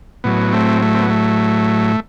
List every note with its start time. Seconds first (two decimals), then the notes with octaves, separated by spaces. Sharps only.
0.24 A2 F#3 B3
0.52 A3 C4
0.82 A3
0.94 C4
1.02 B3
1.10 A3